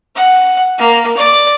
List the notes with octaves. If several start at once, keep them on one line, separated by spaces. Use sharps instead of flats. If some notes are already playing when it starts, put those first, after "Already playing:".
F#5
A#3
D5